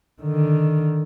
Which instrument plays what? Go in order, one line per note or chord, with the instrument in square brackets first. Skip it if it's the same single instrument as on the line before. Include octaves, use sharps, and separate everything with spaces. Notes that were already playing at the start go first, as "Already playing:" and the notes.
[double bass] D3 D#3